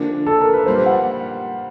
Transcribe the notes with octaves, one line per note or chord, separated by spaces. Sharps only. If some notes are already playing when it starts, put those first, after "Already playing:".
Already playing: D3 F3 A#3 D4
A4
A#4
B4
A#2 G3 A#3 C5
F#5